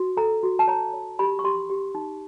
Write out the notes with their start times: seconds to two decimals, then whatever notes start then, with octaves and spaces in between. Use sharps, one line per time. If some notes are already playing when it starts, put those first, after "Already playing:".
Already playing: F#4
0.17 A4 A#5
0.43 F#4
0.59 A5
0.68 C#5 A#5
0.94 C#5
1.19 G4 B5
1.39 C#6
1.44 G4 C6
1.70 G4
1.95 D#4